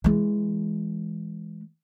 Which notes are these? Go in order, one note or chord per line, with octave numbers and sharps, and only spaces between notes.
E3 G#3